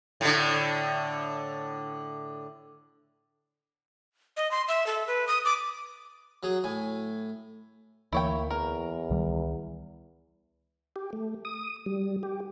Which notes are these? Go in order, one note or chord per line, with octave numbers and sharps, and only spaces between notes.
A2 D3
D#5
C6
E5
A4
B4
D#6
D6
F#3 G#4
A2 G#5
D2 E3 A#3 E4 C#5 G5
E2 A#4
C#2 D#3 G3
G4
A3
D#6
G3
G4